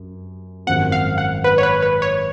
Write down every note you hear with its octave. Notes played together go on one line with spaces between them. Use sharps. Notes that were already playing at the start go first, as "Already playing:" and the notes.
Already playing: F#2
G#1 F#2 F3 F#5
F5
F#5
B4
C#5
B4
B4
C#5